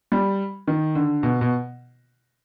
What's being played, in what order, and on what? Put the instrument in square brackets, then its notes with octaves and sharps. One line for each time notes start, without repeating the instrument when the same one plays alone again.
[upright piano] G3
D#3
D3
B2
B2